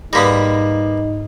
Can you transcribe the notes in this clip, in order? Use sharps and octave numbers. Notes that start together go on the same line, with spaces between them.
G#2 G3 A#3 B3 D#4 A#6